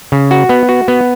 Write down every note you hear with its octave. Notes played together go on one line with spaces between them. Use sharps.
C#3
F#4
B3
F#4
B3